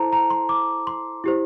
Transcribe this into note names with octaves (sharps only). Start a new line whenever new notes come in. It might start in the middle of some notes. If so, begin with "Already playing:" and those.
Already playing: E4 A4 C5 A5 A#5
A#5
C6
D6
C6
E4 G4 C5